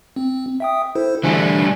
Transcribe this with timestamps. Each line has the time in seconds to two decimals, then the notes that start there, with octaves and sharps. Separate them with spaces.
0.16 C4
0.60 E5 G5 D#6
0.95 E4 A4 C5
1.24 D3 E3 G3 A3 D4 G#5